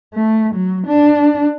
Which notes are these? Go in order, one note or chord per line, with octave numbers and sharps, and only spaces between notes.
A3
F#3
D4